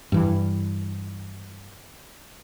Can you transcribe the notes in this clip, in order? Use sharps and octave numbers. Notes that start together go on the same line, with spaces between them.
G2 E3